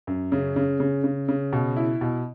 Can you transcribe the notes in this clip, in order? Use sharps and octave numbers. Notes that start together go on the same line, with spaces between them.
F#2
C#3
C#3
C#3
C#3
C#3
B2
E4
B2